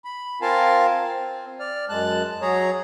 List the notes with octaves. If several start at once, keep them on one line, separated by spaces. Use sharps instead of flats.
B5
C4 F4 A#4 F5 G#5 A5
C4
D5 F6
F#2 G#3 A5 F#6
F#3 G#4 C#5 A#5